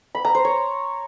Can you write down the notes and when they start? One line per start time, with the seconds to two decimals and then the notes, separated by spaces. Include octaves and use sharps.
0.15 B5
0.25 A#5
0.35 C5
0.45 C#5